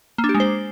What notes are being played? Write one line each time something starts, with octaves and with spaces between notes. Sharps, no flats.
A#3
D4
G4
G#3
C5